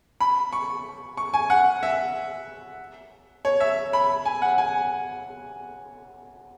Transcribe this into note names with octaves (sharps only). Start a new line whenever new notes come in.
B5
C#6
C#6
G#5
F#5
E5
C#5
E5
B5
G#5
F#5
G#5